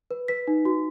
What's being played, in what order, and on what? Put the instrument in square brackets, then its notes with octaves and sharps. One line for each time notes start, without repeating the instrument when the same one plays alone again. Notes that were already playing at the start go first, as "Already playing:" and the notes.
[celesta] B4
B4 B6
D#4
F#4